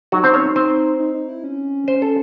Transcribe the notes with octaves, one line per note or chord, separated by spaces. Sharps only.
F#3 D#4 F#4
C4 C5
C#4 C#5
C4 C5
D#4
D#4
E4
C#4
C5
A4